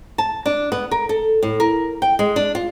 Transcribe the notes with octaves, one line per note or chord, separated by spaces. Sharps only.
A5
D4
B3
A#4
A4
A2
A#4
G5
G#3
D4
F4